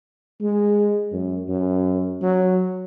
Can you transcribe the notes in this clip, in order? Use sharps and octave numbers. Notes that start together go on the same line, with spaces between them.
G#3
F#2
F#2
F#3